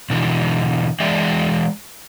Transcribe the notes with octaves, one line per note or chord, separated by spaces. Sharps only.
B2 D3 E3
E3 G#3 G#4 D5 E5 G5